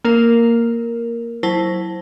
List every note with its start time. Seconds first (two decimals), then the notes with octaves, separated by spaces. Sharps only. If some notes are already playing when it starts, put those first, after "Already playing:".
0.05 A#3 A#4
1.43 F#3 E4 C5 A5 A#6